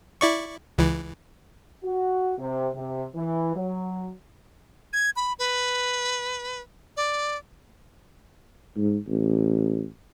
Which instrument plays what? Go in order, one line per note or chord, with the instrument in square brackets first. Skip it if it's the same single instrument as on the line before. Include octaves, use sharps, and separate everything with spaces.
[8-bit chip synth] E4 D5 C#6
C#2 E3
[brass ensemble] F#4
C3
C3
E3
F#3
[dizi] G#6
B5
B4
D5
[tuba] G#2
A1